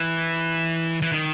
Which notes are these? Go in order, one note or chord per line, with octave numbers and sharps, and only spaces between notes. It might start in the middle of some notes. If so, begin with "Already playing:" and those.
Already playing: E3
E3
D#3